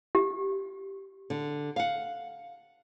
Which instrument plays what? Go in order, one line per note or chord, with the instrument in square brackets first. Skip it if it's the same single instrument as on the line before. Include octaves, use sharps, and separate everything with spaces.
[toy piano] G4
[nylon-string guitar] D3
F5 F#5